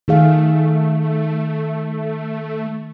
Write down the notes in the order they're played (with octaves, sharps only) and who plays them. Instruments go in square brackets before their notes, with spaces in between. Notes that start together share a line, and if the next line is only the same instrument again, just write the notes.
[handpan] D#3 G#4 F5 [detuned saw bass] A3